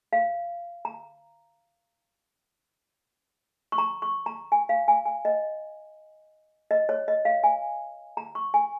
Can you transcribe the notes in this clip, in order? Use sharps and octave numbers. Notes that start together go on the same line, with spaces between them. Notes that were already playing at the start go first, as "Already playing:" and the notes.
F5
A#5
C#6
A#5
C#6
A#5
G#5
F5
G#5
G#5
D#5
D#5
C#5
D#5
F5
G#5
A#5
C#6
G#5